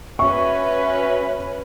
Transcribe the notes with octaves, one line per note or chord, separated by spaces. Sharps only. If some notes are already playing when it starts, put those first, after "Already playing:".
C#4 F#4 B4 E5 C#6